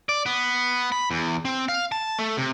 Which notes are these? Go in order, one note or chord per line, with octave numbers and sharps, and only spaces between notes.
D5
B3
B5
E2
C4
F5
A5
A3
C3